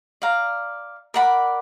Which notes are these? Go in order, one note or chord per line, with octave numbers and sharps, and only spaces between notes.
D5 F5 A#5
A#4 D5 F#5 B5